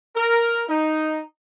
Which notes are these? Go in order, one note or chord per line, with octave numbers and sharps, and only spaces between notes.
A#4
D#4